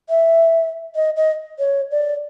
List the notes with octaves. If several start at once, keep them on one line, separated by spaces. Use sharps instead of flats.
E5
D#5
D#5
C#5
D5